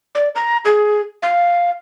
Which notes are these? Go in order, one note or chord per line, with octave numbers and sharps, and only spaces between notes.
D5
A#5
G#4
F5